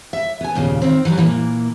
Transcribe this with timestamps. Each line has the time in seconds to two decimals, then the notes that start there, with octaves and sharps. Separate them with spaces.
0.13 E5
0.41 B3 G#5
0.55 D#2 A#2 C#3
0.82 D#3 C4
1.05 E3 F#3 G3 E4
1.17 A#2 E3 A#3